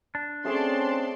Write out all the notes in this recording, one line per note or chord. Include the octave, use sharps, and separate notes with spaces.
D4
A3 C4 C#4 G#4 D5 A5 C6